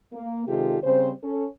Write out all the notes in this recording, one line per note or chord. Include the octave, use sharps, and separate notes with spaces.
A#3
C3 D#3 G#3 F4 G4 A4
C#3 G3 C4 C5
C#4 A4